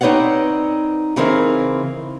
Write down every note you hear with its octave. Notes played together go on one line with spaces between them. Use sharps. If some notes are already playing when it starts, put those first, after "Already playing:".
C4 D#4 B4 C#5 D5 F#5
C#3 E3 C4 D#4 E4 A#4